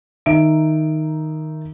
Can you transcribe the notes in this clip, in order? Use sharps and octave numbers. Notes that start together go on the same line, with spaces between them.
D#3 D#4 E5 D7